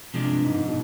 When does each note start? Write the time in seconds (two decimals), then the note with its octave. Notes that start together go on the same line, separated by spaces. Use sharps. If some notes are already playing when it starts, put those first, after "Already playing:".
0.14 C3 F3 G#3 D4
0.24 G2
0.45 G#2
0.55 G#2
0.68 B2